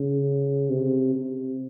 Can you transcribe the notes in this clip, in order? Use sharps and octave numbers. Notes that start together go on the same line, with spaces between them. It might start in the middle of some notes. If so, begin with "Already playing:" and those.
Already playing: C#3
C3
C3